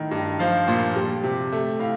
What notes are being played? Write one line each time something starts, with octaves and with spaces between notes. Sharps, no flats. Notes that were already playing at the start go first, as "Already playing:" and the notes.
Already playing: A2 D#3
G2
F3 F5
A#2
G3
C3
A3
A2 F5